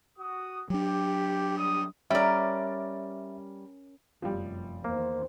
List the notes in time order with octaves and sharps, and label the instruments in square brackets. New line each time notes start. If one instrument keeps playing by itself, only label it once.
[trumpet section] F#4 D#6
[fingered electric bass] F#3 D4 [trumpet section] G4
[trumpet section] G3 D#6
[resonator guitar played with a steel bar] G3 D5 [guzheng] C#4 A#4 [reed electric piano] E5
[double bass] F1 F#2 [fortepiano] F3 G3
[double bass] E2 D#3 [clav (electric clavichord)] A#3 [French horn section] C5